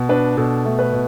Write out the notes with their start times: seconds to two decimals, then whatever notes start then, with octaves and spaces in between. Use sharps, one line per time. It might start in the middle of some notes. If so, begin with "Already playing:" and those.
Already playing: B2
0.09 D4 B4
0.37 B2 A4
0.65 A3
0.79 B4
0.93 B2